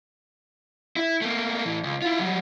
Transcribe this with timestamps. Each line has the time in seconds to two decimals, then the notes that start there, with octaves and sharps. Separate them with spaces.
0.96 E4
1.22 A3 A#3
1.65 A2 E3
1.83 C#2
2.02 E4 F4
2.19 F#3 G3